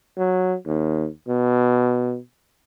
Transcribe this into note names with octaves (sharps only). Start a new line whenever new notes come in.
F#3
D#2
B2